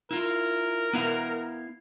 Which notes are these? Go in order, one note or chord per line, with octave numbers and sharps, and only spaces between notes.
E4 F4 A#4
B3 E4 F5